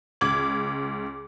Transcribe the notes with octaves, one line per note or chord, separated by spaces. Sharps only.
C#2 D6 G#6 F#7